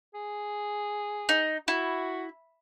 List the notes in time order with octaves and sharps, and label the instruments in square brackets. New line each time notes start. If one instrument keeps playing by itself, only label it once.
[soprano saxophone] G#4
[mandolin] D#4
[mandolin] E4 [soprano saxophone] F#4